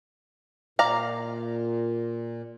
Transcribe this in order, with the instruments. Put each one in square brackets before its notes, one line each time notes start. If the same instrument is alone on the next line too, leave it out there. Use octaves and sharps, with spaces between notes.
[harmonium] A#2 [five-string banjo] D5 F5 A#5